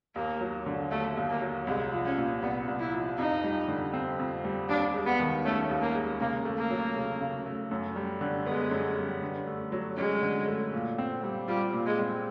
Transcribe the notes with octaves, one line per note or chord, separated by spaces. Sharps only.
D#2 A#3
F#3
D3
D#2 A3
D#2
A#3
F#3
C2 G#3
F3
C#4
A#2
C2 B3
C2
E4
F3
F2 D#4
G3
D3
C4
F2
G3
D#2 D4
G#3
B3
D#3
A3 C#4
D#2
A#3
G#3
C#3 A#3
A3
A#3
F#3
C#3
C#3
A3
F#2
G3
D3
G#3 B3
F#2
G3
D3
A3
F#3
G#3 C#4
D3
A3
A#2
C4
G3
G3 F4
A#2
G#3
C4